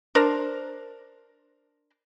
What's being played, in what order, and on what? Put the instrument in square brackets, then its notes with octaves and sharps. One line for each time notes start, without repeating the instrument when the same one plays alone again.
[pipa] D4 A#4 C5